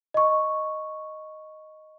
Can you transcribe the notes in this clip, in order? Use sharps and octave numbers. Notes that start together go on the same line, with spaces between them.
D#5 C#6